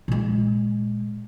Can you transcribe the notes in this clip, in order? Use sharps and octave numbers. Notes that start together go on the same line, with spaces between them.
A#2 G#3